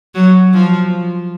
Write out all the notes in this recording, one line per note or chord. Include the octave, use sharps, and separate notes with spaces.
F#3
F3